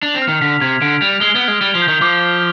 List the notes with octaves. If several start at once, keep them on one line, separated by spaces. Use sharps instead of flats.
D4 F7
C4
F6
D#3
D3 B6
C3 G#6
D3 D7
G3 F7
G#3 G7
B3
F6
G#3
G3 G7
F3
G6
D#3
F3 D6
D6